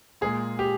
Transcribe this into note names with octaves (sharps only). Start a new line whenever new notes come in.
A#2 G#3 G#4
G4